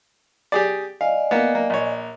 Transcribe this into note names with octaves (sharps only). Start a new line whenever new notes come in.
G4 G#4 D5
D5 D#5 F5 G#5
A#3 B3
A#3
A#1 C#5